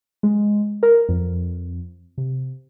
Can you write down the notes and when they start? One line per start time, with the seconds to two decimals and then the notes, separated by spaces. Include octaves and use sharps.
0.23 G#3
0.83 A#4
1.09 F2
2.18 C3